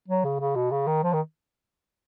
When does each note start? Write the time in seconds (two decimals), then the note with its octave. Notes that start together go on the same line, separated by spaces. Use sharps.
0.08 F#3
0.24 C#3
0.40 C#3
0.55 B2
0.71 C#3
0.87 D#3
1.04 F3
1.13 D#3